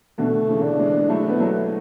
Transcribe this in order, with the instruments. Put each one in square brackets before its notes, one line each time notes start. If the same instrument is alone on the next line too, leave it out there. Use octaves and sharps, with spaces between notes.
[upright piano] B2 D3 [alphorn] A3
[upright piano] C#3 E3
[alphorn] D4
[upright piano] E3 G#3
G#3
[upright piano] F#3 A3 [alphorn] E4
[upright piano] B3
F#3 A3